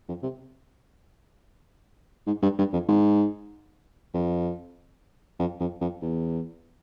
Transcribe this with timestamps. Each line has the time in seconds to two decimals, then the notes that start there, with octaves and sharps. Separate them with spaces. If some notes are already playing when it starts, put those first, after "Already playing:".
0.08 F2
0.23 C3
2.27 G#2
2.42 G2
2.58 G2
2.73 F2
2.88 G#2
4.14 F2
5.39 F2
5.60 F2
5.81 F2
6.02 E2